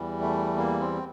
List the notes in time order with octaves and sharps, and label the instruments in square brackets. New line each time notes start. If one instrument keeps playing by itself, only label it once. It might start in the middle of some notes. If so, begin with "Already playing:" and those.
Already playing: [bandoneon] E2 E3 G3
A3
A#3
C4